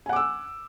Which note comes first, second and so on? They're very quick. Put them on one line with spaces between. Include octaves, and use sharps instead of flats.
G#5 F#5 D6 E6